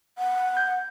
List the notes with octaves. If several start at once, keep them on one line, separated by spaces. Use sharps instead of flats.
F#5
G6